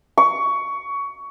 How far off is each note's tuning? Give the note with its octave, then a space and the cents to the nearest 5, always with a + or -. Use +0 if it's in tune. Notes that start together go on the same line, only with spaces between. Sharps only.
C#6 +20